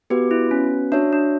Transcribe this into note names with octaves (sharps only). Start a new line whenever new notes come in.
B3 F#4 G4 B4
E4
C#4
D4 F#4 C#5 E5
D4